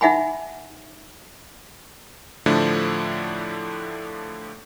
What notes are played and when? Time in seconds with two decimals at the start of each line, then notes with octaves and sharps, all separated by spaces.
0.01 D#4 E5 F#5 G#5 B5
2.46 A2 D3 F3 A3 D4 E4